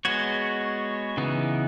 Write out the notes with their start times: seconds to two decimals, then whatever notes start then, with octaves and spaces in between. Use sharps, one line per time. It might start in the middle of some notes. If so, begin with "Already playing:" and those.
0.05 G#3 B3 F#4 C#5
1.17 C#3 E3 B3 D#4